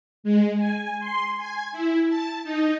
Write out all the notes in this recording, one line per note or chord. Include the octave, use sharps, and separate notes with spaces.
G#3
G#5
C6
G#5
E4
A5
D#4